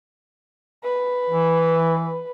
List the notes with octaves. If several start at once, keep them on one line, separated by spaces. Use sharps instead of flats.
B4
E3